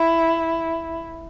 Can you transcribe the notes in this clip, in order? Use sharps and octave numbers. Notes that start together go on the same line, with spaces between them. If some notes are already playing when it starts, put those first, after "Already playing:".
Already playing: E4